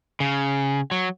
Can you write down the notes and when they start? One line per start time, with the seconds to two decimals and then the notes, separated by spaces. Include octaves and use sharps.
0.20 C#3
0.91 F#3